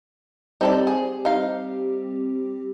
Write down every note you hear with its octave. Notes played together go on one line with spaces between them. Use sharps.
G3 C4 D#4 G4 A4 D5
G#4
D#4 F5